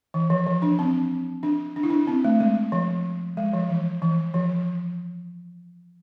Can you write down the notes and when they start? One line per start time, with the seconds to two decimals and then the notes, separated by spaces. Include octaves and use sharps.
0.14 E3
0.30 F3
0.47 F3
0.62 D4
0.79 C4
1.43 D4
1.76 D4
1.83 E4
1.90 D4
2.07 C4
2.24 A3
2.40 G#3
2.72 F3
3.37 G#3
3.53 F3
3.69 E3
4.02 E3
4.34 F3